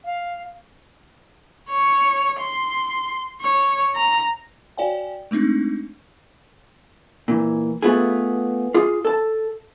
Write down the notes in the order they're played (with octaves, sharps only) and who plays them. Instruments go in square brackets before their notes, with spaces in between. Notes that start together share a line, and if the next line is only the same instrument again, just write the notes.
[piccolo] F5
[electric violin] C#5
C6
C#5
A#5
[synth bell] F#4 C#5 D5 F5 G5 G#5
G#3 A3 C4 D4 D#4
[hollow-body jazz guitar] A#2 E3
A3 B3 F4 G#4
F4 G#4
A4 A5